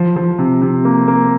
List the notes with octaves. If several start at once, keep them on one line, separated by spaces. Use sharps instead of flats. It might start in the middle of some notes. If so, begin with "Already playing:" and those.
Already playing: F3
F3
C3
C3
A#3
A#3